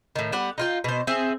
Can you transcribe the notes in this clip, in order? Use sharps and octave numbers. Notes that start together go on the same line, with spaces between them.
A2 D#3
G3 B3 F#5
D#4 F4 G5
B2 C5
C4 G#4 E5